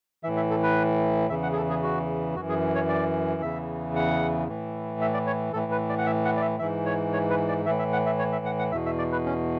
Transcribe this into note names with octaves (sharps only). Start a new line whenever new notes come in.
A2 E3 E5
E5
A4
B4
E2 C#3 E3 E5
F#5
G#4
A4
G#4
F#4
F#2 E3 F#4
G#4
C#5
D5
E2 C#3 E3 E5
F#5
A2 E3
E5
D5
C#5
A2 E3 A4
B4
D5
F#5
E5
F#5
D5
E5
G#2 E3 E5
C#5
C#5
B4
D5
A2 E3 E5
E5
F#5
E5
C#5
E5
F#5
F#5
E2 B2 E5
E5
D5
B4
C#4